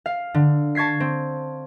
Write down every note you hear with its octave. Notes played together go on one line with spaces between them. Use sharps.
F5
D3
A5 C#6 G#6 B6 C7
C4